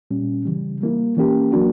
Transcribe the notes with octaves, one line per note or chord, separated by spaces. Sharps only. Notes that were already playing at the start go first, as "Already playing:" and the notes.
A#2 G3 C#4
C#3 E3 G3
G3 A#3 E4
E3 A#3 C#4 G4
F#3 A#3 D4 F#4